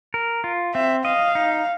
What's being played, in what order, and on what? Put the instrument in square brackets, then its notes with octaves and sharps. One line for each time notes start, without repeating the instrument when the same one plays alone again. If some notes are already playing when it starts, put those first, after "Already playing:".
[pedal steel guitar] A#4
F4
[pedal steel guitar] C4 [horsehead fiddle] E5
[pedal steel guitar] D#5 [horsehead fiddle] F5
[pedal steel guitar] D#4